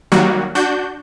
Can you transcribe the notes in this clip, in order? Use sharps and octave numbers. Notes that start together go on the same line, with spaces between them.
D#3 F#3 G3 A#3 F#4
D4 F#4 G6